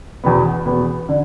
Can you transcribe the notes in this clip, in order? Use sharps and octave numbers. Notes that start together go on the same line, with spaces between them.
E2 B2 B3
E2 B2 B3
D3